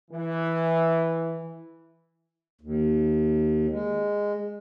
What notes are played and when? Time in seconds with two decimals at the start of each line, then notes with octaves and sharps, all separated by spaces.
0.11 E3
2.61 D#2
3.70 G#3